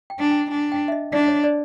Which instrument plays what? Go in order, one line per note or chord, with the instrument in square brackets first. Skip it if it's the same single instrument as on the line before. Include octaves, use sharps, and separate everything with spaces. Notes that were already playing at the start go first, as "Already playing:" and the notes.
[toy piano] G5
[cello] D4 [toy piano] G#5
[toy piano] G5
[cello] D4 [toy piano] G#5
[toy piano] G5
E5
D#5
[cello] D4 [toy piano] D5
[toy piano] C#5
D5